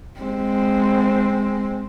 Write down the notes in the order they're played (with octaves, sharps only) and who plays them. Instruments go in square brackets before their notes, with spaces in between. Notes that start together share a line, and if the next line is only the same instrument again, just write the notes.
[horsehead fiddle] G#3 C4